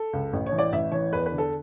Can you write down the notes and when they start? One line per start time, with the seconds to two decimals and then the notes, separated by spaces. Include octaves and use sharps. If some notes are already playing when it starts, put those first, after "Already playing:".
Already playing: A4
0.13 C#2
0.33 A1
0.46 C#5
0.52 E3
0.59 D5
0.72 A1 E5
0.92 E3 C#5
1.12 E2 B4
1.26 B4
1.32 D3
1.38 A4